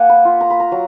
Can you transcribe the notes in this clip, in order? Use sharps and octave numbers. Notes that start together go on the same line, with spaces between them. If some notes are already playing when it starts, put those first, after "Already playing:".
Already playing: A#3 F#5 G#5
B5
F4
A#5
B5
A#5
F#3